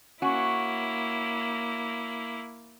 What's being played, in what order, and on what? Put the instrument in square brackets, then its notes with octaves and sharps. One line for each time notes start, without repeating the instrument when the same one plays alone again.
[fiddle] A#3 E4 [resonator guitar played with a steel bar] C#4 F#4